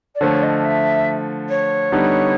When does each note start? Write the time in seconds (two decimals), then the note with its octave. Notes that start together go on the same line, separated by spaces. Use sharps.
0.15 D5
0.21 D3 F3 A3 C#5
0.43 D#5
0.64 E5
1.49 C#5
1.92 D3 G3 B3 D#4